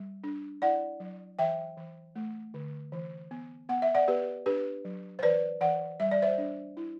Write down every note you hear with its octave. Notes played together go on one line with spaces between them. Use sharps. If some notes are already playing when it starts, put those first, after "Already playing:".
Already playing: G3
D4
E4 D5 F#5
F#3
E3 E5 G5
E3
A3
D3
E3
B3
B3 F#5
E5
D5 F#5
B3 G4 B4
D4 G4 B4
F#3
C5
E3 B4 D5
E3 D5 F#5
G3 E5
D5
C5 E5
D4
E4